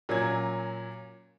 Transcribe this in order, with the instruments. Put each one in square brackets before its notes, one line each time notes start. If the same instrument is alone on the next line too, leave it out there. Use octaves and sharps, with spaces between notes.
[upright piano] A#2 F#3 C#4 G#5 G#6